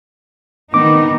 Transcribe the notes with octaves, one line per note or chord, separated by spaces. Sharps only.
D#3 B3 D#4 D6